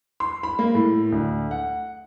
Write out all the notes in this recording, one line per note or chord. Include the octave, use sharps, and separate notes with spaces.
C6
B5
A#3
A2
D2
F#5